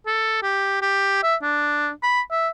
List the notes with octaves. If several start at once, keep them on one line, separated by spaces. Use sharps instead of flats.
A4
G4
G4
E5
D4
B5
E5